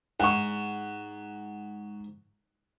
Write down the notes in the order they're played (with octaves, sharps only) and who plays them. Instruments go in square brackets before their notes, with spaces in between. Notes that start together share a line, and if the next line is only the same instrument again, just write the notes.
[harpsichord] G#2 [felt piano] F#5 C#6